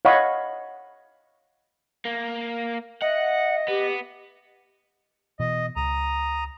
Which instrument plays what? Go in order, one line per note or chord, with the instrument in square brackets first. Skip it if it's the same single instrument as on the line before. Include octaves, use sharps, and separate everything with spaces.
[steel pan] C#5 D#5 F5 F#5 B5 C#6
[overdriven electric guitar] A#3
[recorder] D#5 [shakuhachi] E5 [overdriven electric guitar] F#5
[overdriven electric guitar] B3 [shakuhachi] G4
[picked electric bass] B2 E3 [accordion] D#5
[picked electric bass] C#2 [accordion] A#5 D#6